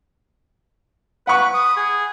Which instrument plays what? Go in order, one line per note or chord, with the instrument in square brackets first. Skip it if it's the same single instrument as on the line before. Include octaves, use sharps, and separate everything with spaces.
[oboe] B4 [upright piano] F#5 B5 C#6
[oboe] D#6
G#4